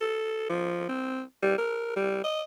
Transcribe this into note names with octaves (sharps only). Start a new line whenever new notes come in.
A4
F3
C4
G3
A#4
G3
D#5